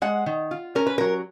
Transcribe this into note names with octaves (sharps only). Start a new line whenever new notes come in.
G#3 F#5
D#3
F4
C#4 A#4
B4
F#3 A#4